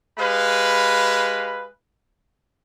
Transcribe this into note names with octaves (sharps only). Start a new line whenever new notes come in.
G#3 G4 B4 F5 B5